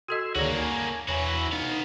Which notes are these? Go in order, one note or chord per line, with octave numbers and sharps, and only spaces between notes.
F#4 A4 D#5 C6 E6 G#6
D2 D#3 A#3 F#4 G#4 C#5 D5
G#5
E2 E3 F#4 C#5 G#5 B5
B3 D#4 F5